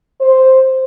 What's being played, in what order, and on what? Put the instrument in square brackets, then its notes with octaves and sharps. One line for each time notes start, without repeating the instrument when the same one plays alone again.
[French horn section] C5